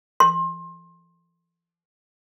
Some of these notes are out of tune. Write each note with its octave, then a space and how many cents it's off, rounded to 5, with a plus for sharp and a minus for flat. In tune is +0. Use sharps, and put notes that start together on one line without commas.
C6 +25